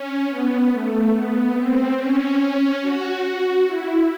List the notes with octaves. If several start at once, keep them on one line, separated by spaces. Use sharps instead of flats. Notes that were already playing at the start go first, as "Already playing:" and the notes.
Already playing: C#4
B3
A3
B3
C4
C#4
C#4
F#4
F#4
E4